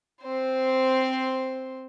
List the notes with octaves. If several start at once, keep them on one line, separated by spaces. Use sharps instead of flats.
C4 C5